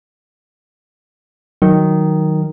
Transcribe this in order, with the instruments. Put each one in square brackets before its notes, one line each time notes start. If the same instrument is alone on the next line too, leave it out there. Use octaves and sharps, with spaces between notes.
[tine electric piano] D#3 [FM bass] F#3